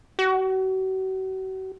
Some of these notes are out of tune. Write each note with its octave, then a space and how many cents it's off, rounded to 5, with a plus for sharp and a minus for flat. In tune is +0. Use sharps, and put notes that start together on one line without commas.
F#4 +40